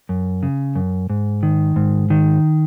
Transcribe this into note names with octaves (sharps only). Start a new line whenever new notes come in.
F#2
C#3
F#2
G#2
D#3
G#2
D#3